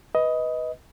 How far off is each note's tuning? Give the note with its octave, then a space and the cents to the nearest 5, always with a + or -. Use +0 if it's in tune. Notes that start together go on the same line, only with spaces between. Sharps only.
B4 +0 D#5 +15